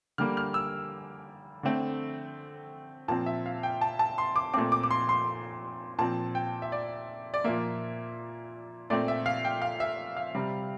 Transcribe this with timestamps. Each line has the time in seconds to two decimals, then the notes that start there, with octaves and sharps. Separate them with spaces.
0.18 D3 G3 A#3 F6
0.37 F6
0.54 E6
1.63 D3 A3 C4
3.08 A#2 F3 C4 A5
3.26 E5
3.46 F5
3.63 G5
3.81 A5
3.99 A5
4.18 C6
4.36 D6
4.54 A#2 A3 C4 D6
4.72 D6
4.83 D6
4.90 C6
5.09 C6
5.99 A#2 F3 C4 A5
6.35 G5
6.62 E5
6.72 D5
7.34 D5
7.44 A#2 F3 A#3 E5
8.90 A#2 A3 C4 D5
9.08 E5
9.26 F5
9.45 G5
9.62 F5
9.80 E5
10.17 F5
10.35 C3 G3 C4